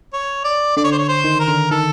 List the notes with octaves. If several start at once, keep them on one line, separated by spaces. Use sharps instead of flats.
C#5
D5
D3 D5
C#5
C5
C#5
C5
D#3
A#4
D3
D#3 A4